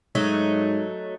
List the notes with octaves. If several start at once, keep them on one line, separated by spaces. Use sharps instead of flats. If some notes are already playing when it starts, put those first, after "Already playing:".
G#2 F#3 A3 D#4